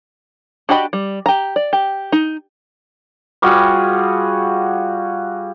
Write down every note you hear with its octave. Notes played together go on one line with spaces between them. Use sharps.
D4 F#4 G4 D#5 B5
G3
G4 A#5
D5
G4
D#4
G3 F4 F#4 G#4